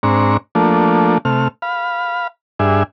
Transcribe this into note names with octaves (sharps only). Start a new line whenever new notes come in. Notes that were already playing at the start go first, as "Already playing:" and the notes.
G#2 C4 D4 A#5 C#6
F3 A3 A#3 D4
C3 A3 F6
F5 B5
G2 D4 G#4 E5